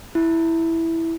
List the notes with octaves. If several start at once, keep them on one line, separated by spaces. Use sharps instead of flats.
E4